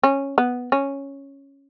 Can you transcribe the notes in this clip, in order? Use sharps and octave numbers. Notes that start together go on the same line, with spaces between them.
C#4
B3
C#4